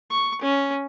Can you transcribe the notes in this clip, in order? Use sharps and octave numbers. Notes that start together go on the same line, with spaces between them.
C#6
C#4